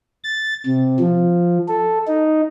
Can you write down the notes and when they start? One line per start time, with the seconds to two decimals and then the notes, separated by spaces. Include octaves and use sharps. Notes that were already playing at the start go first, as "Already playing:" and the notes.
0.24 A6
0.66 C3
1.00 F3
1.68 A4
2.07 D#4